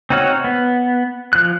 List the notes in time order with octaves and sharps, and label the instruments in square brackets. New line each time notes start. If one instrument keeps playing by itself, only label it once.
[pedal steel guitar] C4 D#4 F#4 C#5 F6
B3
F3 F#6